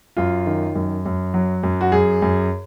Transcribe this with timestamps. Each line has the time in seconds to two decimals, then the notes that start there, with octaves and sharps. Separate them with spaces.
0.17 F#2 F4
0.46 D#3
0.75 F#2
1.05 F#2
1.34 F#3
1.63 F#2
1.81 F#4
1.92 F#2 G#4
2.22 F#2